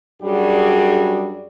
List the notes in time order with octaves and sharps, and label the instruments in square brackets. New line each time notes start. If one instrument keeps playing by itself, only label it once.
[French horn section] F#2 G3 D4 F#4 G#4